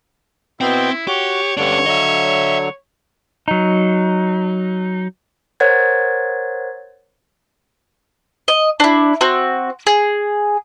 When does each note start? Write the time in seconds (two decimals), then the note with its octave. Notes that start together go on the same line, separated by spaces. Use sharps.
0.61 B2 B3 C4 E4 G5
1.08 F#4 G4 C#5
1.57 G2 D3 C#4 D4 C#5
1.86 D3 F#3 D#5 E5
3.48 F#3 D#4
5.60 A#4 C5 C#5 F#5 G#6 A6
8.48 D#5
8.80 D4 E4
9.21 C4 F#4
9.87 G#4